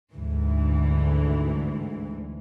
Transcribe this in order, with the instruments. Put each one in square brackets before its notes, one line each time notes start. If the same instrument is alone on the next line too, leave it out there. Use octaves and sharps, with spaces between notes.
[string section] D2 G#2 E3